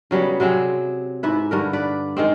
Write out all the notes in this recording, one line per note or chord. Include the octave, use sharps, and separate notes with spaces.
C#3 F#3 G3 B3
C3 F#3 C4 G#4
G#2 E4 B4
G2 D3 A#4
B4 D5
D#3 G#3 C4